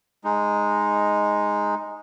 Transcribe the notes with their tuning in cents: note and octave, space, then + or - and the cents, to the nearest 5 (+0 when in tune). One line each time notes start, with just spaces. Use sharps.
G#3 +0 D#4 +0